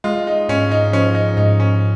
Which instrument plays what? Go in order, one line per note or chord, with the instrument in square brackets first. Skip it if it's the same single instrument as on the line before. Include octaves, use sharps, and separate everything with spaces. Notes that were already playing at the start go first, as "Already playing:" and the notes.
[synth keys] G#3 [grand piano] F4
[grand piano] D#4
[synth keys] G#2 [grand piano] C#4
[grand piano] D#4
[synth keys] F3 [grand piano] C#4
[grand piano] D#4
[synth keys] G#2 [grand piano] D#4
[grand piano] C#4